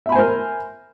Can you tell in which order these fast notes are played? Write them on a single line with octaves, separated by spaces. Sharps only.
E5 B5 G#5 C5 A#4